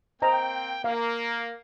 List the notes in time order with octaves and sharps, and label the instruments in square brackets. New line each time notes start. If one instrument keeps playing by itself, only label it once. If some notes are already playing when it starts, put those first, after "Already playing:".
[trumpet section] A#3 C4 G5 [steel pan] C5 D#5 A#5
[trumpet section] A#3 [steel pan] F5